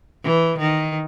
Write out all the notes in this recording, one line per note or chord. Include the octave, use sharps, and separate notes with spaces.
E3
D#3